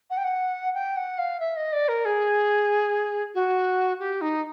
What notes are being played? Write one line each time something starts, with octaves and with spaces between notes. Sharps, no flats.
F#5
G5
F#5
G5
F#5
F5
E5
D#5
D5
A#4
G#4
F#4
G4
D#4